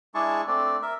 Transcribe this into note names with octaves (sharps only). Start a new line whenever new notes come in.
G#3 D4 E4 G#4 A5 C#6
A3 C4 D4 D5
A#4 E5